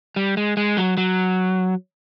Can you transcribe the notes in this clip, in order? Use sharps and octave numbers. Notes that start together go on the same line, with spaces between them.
G3
G#3
G#3
F#3
F#3